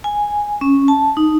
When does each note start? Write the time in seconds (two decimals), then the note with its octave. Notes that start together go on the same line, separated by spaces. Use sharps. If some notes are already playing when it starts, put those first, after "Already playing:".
0.04 G#5
0.61 C#4
0.88 A5
1.17 D#4